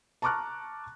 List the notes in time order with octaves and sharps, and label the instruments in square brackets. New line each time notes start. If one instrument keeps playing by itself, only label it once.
[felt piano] A5 A#5 C#6 D6 F6 F#6